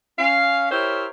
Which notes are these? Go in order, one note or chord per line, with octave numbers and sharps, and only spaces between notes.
C#4 F5
E4 G4 A#4 C5 C#5 E5